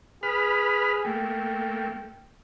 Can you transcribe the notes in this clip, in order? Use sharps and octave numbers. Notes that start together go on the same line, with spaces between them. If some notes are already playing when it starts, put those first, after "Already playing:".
G#4 B4 B5 F6
A3 A#3 G5